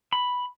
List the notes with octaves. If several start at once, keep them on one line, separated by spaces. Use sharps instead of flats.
B5